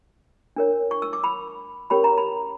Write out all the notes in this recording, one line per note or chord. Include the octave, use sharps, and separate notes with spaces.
D4 A#4 C#5
C#6
E6
D6
B5
C#4 G4 A#4 C#5 B5
A#5
B5